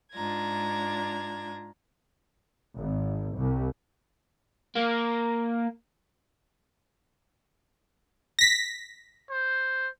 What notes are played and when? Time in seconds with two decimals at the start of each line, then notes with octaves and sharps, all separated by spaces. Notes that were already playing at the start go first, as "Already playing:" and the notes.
0.12 G#2 D4 F4 A#5 G#6
2.75 G#1
3.35 C2
4.75 A#3
8.39 A#6 B6
9.30 C5